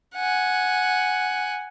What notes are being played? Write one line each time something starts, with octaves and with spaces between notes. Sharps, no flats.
F#5 G#5